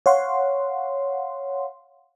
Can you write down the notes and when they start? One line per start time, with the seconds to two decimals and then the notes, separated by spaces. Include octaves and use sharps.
0.06 C#5 F5 F#5 C6